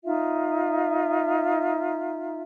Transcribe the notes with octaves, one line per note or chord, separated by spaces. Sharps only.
D#4 F4 E5